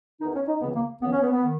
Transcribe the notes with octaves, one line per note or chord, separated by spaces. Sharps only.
E2 D#3 D#4
C#4
D#4
C#2 C#3 E3 B3
A#3
C#2 C#3 E3 B3
C#4
B3
B3
D#3